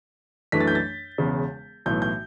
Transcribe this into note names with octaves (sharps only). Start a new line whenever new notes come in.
F#2 E3 A3 D4 B6
A6
G6
A6
E1 E2 C#3
B1 A2 E3 G6
G6